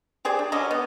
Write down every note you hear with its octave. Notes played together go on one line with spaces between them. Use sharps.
G4 G#4 C5 D5
D4
D3 F#3 C#4 D#5
B3